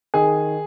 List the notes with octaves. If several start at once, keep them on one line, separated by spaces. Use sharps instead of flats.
D#3 G#4